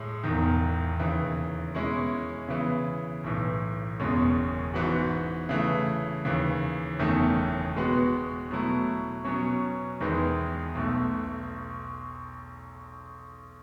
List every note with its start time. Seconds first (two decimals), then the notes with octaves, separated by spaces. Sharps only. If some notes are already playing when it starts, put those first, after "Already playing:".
Already playing: A2 G#3
0.24 E1 E2 D#3
1.00 D#2 C#3 E3
1.75 B2 G#3 C#4 E4
2.49 C#3 E3 B3
3.24 B1 A2 E3
4.00 F#1 E2 B2 G#3 C#4
4.74 G#2 E3 B3 F#4
5.49 C#3 E3 A3
6.25 D#2 C#3 E3
6.99 F#1 E2 D#3 A3 C#4
7.75 B2 G#3 B3 F#4
8.50 B2 F#3 A3 E4
9.24 B2 F#3 C#4
10.01 E2 D#3 G#3 B3 E4
10.75 B1 B2 A3